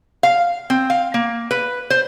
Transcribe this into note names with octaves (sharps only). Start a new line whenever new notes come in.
F5
C4
F5
A#3
B4
C5